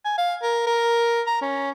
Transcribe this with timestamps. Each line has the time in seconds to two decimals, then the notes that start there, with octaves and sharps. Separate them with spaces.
0.05 G#5
0.18 F5
0.43 A#4
0.67 A#4
1.26 A#5
1.42 C#4